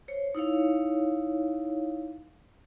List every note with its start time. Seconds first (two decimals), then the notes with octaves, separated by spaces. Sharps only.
0.08 C5 C#5
0.35 D#4 E4 C#5 F5